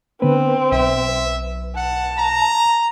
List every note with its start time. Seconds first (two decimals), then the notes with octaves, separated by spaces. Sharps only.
0.22 D3 B3 C4 B4
0.72 B1 E5
1.76 F#5 A5
2.18 A#5